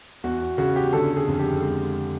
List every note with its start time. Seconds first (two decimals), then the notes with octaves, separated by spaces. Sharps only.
0.24 E2 F#4
0.58 C#3 F#4
0.76 G4
0.93 D3 A4
1.17 G#4
1.28 F2
1.39 G4
1.62 G#3